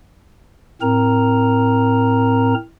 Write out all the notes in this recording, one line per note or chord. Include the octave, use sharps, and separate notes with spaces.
A2 C4 A#4 A#5